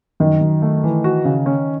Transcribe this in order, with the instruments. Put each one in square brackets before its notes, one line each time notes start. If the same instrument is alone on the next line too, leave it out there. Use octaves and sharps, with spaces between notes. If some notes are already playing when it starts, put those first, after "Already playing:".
[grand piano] F#2 [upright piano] D#3
[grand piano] F#2
A3
E3
F#4
C#3
C#4